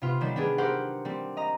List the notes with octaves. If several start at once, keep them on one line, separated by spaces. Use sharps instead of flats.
C3 B3 F4
D#3 F#3 G3 E7
B3 D4 G#4
F#4 G4 A#4 C5 F#5
G3 C4
D#5 A#5